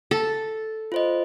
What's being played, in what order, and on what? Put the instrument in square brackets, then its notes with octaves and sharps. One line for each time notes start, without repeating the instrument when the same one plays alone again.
[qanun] A4
[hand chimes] F4 C5 D#5